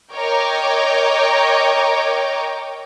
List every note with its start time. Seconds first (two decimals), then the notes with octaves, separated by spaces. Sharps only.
0.14 A#4 C#5 D#5 G5 D6